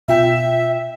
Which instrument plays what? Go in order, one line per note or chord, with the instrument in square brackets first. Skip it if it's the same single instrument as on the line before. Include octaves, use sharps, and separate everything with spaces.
[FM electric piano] B2 F4 G5 [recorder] E5